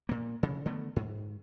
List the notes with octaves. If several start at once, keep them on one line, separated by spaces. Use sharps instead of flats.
A#2 A#3
C#3
D3 D#3 A3 B3
G#2